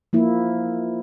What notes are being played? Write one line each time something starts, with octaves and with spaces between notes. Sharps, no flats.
F3 A#3 E4